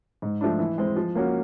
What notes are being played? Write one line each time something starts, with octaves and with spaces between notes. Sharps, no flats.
G#2
F3 A3 D4
E3
G#3 C4
F3
A#3 C#4 F#4